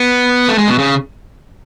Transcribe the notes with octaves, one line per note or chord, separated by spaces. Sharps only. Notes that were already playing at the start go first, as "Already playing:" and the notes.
Already playing: B3
A3
G#3
B2
C#3